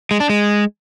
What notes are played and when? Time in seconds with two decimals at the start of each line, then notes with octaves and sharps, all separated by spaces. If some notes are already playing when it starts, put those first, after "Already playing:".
0.11 G#3
0.20 D4
0.29 G#3